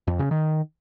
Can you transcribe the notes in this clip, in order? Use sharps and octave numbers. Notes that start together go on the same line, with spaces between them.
F2
C#3
D#3